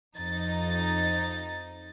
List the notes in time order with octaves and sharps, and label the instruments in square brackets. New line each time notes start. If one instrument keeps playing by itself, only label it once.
[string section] F2 D#4 A6